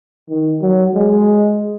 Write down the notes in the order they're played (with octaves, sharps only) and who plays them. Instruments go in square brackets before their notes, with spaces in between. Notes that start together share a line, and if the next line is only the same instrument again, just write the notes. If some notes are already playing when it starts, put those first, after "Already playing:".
[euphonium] D#3
F#3
G#3